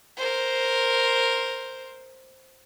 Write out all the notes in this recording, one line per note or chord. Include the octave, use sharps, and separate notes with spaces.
A#4 C5